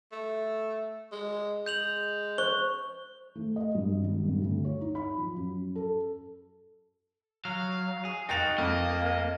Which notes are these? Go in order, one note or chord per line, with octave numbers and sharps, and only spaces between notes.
A3
G#3
G#3 G6 F7 F#7
C5 C#6 G7
A3
D#5
G2
G#1
G2
D2
C#5
D#4
B5
F3
F#2
A4
F#3 F5
G#4
D#4 F#4 G5 A6 F7
F2 A#3 D#5